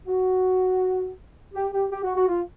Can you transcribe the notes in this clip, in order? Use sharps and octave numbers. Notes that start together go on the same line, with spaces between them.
F#4
G4
G4
G4
F#4
F#4
F4